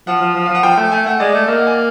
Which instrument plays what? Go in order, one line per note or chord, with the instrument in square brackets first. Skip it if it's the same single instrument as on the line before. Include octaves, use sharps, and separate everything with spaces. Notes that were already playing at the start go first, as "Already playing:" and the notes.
[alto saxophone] F3 [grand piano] F#5
[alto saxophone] F3
F3
[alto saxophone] F3 [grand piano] F5
[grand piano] F#5
[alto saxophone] F3 [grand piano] G5
[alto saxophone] A3 [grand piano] G5
[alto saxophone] A3 [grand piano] G#5
[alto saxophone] A3 [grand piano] F#5
[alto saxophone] G#3 [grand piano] D5
[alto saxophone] A3
[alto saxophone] A#3 [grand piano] D#5
[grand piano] F#5
G#5